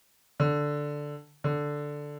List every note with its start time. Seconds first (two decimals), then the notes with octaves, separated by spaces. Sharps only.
0.40 D3
1.44 D3